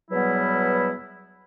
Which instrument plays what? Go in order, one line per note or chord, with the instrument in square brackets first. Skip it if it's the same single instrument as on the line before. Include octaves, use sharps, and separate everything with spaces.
[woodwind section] E2 B2 F#3 G3 B3 E4